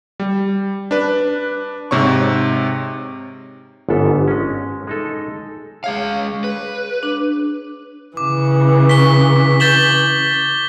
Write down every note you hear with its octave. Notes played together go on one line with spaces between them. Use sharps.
G3
D4 B4
G#2 C3 C#5 C#6
G1 G#2 B3 A4
G#3 C#4
G#3 D#4 A4
G#3 G#4 C#5 F5
B4
D4
C#3 E3 D6
C#6 B6 G7
G6 A6 B6 E7 F#7 G7